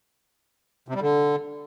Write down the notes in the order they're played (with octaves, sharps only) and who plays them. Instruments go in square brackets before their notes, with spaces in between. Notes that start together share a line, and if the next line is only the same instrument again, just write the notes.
[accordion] C3
G3
D3